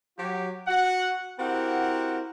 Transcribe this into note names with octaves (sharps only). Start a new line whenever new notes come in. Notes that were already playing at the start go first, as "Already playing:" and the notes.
F#3 F#4 G4
F#4 F#5
C4 E4 F#4 G4 A#4 F#5